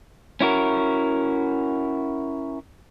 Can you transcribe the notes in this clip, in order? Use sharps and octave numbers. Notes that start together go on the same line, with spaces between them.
C#4 E4 F#4 A#4